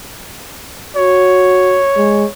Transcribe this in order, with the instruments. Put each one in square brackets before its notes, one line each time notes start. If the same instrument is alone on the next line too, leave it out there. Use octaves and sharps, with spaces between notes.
[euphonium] F#4 [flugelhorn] C#5
[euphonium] G#3